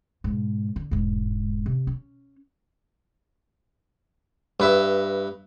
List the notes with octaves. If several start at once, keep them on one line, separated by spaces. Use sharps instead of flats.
G#2 B2
D3
E1 G#2
C3
C#4
G2 B4 E5